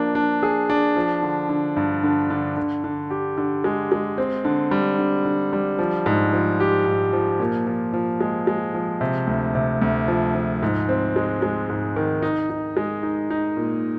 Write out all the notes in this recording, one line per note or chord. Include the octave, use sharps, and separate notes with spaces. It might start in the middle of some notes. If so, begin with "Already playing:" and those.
Already playing: F3 A#3 D4
D4
G#4
D4
F3
D3
D3
G2
D3
D3
D3
D3
G4
D3
G#3
G#3
C4
D3
G3
D3
D3
G3
F3
G#2
F3
G4
G#2
F3
A#2
F3
F3
G#3
G#3
F3
C3
D2
C3
D2
F3
F3
G#2
C4
G#3
G#3
G#2
D#3
D#4
D#4
G#3
D#4
D#4
A#2